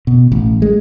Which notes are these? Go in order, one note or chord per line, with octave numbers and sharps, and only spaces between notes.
B2
A1
G#3